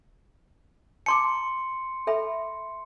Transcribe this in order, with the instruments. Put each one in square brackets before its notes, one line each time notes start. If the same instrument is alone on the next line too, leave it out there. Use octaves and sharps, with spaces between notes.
[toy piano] A5 A#5 D6 [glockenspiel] C6 C#7
[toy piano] A4 E5 B5